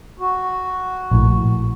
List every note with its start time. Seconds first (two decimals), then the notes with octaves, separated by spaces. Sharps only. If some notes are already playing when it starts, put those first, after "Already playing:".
0.20 F#4
1.11 A#1 A2